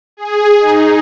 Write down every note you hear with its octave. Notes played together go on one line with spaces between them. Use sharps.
G#4
D#4